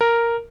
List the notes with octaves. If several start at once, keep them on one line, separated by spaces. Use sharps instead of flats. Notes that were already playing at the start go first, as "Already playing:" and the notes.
A#4